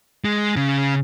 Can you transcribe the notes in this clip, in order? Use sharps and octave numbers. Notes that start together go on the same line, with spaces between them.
G#3
C#3